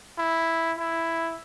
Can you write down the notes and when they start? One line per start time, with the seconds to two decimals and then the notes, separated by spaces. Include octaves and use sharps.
0.18 E4
0.78 E4